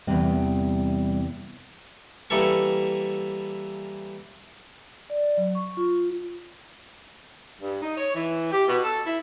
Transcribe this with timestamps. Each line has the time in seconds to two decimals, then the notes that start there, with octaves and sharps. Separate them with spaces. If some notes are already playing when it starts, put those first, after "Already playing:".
0.07 E2 C3 G3
2.30 E3 G3 A#3 E4 A4 C#6
5.10 D5
5.37 F#3
5.55 C#6
5.77 F4
7.61 G2
7.82 D#4
7.97 C#5
8.15 E3
8.52 G4
8.68 B2
8.84 A4
9.06 E4